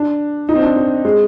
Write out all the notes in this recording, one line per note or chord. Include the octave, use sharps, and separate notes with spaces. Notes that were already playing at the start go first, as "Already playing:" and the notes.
Already playing: D4
D#4
C4
D4
C4
G#3